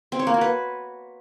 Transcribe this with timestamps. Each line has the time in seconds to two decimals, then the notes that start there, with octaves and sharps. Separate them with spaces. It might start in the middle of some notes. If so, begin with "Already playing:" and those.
0.12 C4
0.19 C#5
0.27 A#3
0.34 F#4
0.41 B4